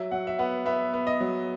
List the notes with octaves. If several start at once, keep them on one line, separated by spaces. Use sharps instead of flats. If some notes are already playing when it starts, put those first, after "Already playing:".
Already playing: F#3 E5
F#3 F#5
E5
B3 F#5
B3 E5
B3
D#5
F#3